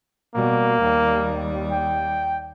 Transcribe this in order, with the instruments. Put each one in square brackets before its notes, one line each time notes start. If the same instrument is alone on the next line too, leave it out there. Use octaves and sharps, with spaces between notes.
[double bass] B2 G3 [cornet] A#3
[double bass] D#2 G3
[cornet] G5